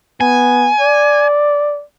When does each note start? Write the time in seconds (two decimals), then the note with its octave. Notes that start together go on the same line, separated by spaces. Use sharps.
0.21 B3 G#5
0.81 D5